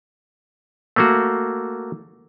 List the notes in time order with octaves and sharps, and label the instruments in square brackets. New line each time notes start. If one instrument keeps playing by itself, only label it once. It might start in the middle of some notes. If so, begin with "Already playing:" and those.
[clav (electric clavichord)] A3 A#3 F#4